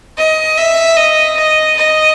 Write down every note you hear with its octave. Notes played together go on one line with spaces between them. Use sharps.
D#5
E5
D#5
D#5
D#5